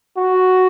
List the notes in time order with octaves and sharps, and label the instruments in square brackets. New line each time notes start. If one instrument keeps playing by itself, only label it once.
[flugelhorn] F#4